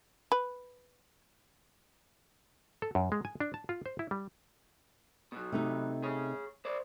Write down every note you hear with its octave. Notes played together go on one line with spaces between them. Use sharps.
B4
A4
F#2
G#3
G#5
D4
A5
F4
C5
E4
G3
B2 F#3
C3 A3 D#4
G#4 C#5
C5 D5